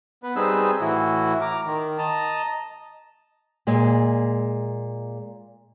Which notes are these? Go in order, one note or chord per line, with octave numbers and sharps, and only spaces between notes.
B3 B4
G3 C4 D#4 G#4 B4 E6
A2 E3 E4 F#4
A#5 D6 F6
D#3
D#5 A5 A#5
A#2 G#3